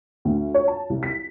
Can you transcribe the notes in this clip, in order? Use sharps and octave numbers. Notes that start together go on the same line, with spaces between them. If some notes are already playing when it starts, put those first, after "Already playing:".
D2
C#5
A5
C2
B6